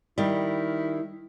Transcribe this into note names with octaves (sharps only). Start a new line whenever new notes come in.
D#3 G3 E4